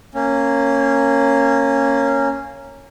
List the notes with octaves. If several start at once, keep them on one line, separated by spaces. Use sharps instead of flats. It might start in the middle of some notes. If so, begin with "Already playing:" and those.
A#3 C#4